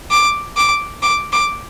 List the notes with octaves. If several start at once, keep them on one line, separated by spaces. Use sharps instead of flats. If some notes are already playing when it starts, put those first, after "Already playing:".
D6
D6
D6
D6